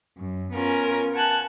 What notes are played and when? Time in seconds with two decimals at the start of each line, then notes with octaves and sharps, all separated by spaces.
0.17 F#2
0.53 B3 C#4 F4 A#4 G#5
1.14 F#5 G#5 A5 F#6